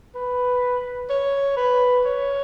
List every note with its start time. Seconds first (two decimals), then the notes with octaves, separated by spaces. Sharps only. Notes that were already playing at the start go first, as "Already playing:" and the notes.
0.15 B4
1.10 C#5
1.57 B4
2.05 C#5